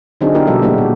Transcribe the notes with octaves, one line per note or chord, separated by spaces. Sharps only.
D3 F#3 C4 D4 D#4 G#4
B3 D4 E4 G4 A#4
B2 F#3 G#3 F4 A4 E5
F#3 G3 A#3 D4 F#4 G4
A#2